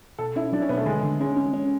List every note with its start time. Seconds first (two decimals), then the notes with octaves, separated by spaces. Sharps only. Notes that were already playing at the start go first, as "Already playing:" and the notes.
0.19 B2 A4
0.36 C#4 E4
0.52 F#3 D4
0.62 C#4
0.69 B2 B3
0.77 A3
0.86 D3 G#3
1.03 D3
1.20 G#3 C#4
1.36 C#4
1.53 C#4